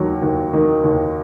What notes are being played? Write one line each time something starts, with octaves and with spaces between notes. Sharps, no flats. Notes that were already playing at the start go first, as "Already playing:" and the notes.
Already playing: D#2 D#3 F#3
D#2
D#3
D#2